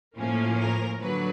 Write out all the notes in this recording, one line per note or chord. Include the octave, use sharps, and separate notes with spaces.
A2 F3 A#3 C#4
A#4
D3 F#3 B4